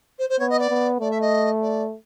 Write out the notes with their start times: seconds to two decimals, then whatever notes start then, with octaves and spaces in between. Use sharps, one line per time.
0.18 C5
0.29 C5
0.39 B3 C#5
0.49 D#5
0.59 D5
0.70 B3
1.00 A3 D5
1.11 E5
1.21 D#5
1.61 D5